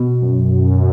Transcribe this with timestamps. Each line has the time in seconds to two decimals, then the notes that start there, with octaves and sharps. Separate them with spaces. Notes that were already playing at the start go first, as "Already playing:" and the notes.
Already playing: B2
0.22 F#2